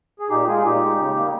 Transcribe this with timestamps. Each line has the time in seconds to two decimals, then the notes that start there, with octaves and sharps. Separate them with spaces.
0.20 G#4
0.29 A#2 D#4 G4
0.47 G#3 F4 G#4
0.64 A#2 D#4 G4
0.82 G#3
0.98 C#3
1.16 G3 A#3